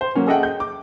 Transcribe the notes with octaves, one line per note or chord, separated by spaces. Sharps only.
C5
F#3 A#3 C#4
G#4 A4 D#5 E5 F#5 G5
G6
D6